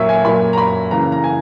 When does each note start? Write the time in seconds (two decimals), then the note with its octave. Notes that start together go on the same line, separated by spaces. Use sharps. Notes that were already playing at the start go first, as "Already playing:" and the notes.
Already playing: A#2 F#3 A#3 C#5 E5
0.09 G#5
0.25 A#2 F#3 A#3 B5
0.53 A#5
0.58 B5
0.91 C#3 E3 A#3 A#5
1.12 A#5
1.24 G#5